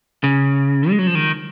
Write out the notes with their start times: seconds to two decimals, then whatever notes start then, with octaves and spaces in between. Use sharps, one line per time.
0.24 C#3
0.90 G#3
0.99 F#3
1.07 F3
1.15 D#3